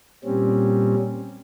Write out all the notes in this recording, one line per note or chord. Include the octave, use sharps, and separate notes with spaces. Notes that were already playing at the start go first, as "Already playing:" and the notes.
A#2 G3 C4 C#4